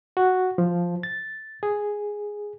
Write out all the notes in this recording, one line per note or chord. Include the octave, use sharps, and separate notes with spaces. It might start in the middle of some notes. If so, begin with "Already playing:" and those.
F#4
F3
A6
G#4